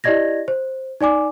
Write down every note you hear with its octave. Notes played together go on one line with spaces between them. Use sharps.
E4 G4 D5 D#5 G#6 A#6
C5
D#4 D5 G#5 D6